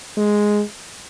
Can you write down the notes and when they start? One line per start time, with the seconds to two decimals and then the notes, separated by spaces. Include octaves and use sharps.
0.17 G#3